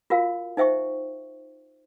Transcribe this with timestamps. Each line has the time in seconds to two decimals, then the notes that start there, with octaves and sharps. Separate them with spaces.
0.10 F4 F#4 A#4 F5
0.57 D#4 C5 E5 G5 C#6